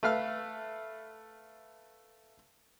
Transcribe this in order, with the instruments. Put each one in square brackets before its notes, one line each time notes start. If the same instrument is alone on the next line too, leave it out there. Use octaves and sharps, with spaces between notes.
[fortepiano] A3 B4 F5 F6